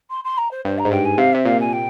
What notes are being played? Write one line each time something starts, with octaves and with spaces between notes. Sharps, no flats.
C6
C6
A#5
C5
G2 C5
A#5
G#2
G2 G5
G#5
C3 F5
C3 E5
A#2 F5
G#5
G5